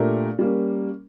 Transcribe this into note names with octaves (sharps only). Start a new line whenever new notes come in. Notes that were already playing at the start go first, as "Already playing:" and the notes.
Already playing: A#2 A3 D4 G4 A#4
G3 A#3 C#4